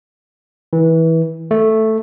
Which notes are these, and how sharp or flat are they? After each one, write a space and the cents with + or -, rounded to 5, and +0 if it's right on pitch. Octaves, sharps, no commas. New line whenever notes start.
E3 -20
A3 +0